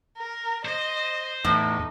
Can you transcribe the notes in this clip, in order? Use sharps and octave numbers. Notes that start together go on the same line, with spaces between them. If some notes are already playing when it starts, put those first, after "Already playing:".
A#4
C5 D#5
E2 A2 D#4